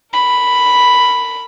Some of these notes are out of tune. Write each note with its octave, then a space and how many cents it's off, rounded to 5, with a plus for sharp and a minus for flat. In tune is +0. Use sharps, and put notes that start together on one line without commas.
A#4 -30 B5 +0